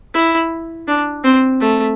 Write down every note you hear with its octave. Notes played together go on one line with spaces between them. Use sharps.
E4
D4
C4
A3